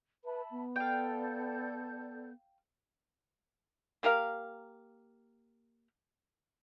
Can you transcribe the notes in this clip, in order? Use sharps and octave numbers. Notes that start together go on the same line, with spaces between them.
B4 E5 A5 B5
B3
A4 D5 F5 G5 G6
A#3 G4 A#4 F5